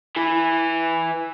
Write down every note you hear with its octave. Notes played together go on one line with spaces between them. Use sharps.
E3 E4